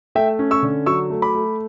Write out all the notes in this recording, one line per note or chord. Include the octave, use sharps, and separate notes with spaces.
A3 E5 G5
C#4
C#6 E6
D3
F#3 C#6 E6
A3
B5 D6
A3